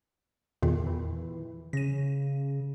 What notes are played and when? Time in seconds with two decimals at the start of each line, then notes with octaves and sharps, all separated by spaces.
0.63 E2 A#2 D#3
0.87 E3
1.73 C#3 A#6 D#7